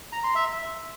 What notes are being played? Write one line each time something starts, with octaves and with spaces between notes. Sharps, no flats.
A#5
C6
E5
E5